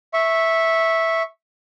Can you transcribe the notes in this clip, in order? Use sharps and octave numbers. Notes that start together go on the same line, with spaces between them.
E5 C#6